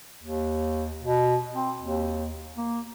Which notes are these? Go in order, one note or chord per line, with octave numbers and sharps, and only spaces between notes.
D#2
B2
C4
D#2
A#3